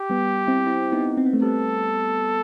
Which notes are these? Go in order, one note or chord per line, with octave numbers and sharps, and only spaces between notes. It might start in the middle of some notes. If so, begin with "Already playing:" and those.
Already playing: G4
G3 B3
C4 E4
C4 E4
B3 D#4
C4
B3
A3
G3 B3 A4